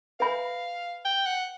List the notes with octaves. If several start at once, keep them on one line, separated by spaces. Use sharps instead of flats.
B4 E5 F5 G#5 B5
G5
F#5